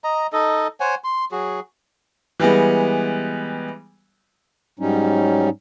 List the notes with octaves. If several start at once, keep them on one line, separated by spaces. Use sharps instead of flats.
D#5 A#5
D#4 A4 D#5
C5 C#5 F#5 G#5
C6
F#3 F#4 G#4
E3 G3 G#3 B3
G#2 F#3 G3 C#4 D#4